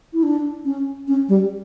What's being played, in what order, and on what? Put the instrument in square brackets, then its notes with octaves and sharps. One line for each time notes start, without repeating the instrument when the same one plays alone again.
[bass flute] E4
D4
C#4
C#4
G3